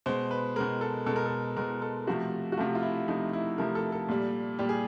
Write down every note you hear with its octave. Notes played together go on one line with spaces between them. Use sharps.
B2 G#3 C5
B4
B2 G#3 A#4
A4
B2 G#3 A4
A#4
A4
B2 G#3 A#4
A4
C3 F3 A3 F#4
F#4
C3 F3 A3 F4
F4
E4
C3 F3 A3 D#4
E4
C3 F3 A3 A#4
A4
A4
A#2 G3
A#2 G3 G4
G#4